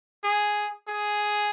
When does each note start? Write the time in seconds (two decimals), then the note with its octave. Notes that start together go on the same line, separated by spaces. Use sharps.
0.24 G#4
0.88 G#4